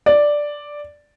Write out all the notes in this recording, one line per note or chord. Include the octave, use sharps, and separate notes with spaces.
D5